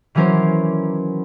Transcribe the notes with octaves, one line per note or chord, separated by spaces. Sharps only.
D#3 E3 F#3 C#4 A#4 C5